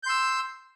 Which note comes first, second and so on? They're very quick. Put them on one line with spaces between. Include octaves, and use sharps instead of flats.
G6 C6 E6